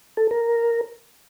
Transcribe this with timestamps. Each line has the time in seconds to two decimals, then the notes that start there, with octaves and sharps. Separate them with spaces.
0.17 A4
0.31 A#4